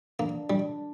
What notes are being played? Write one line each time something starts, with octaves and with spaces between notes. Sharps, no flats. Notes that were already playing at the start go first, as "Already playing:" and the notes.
A#3 D4
G3 D4